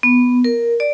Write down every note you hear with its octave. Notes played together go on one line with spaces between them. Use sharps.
B3
A#4
D5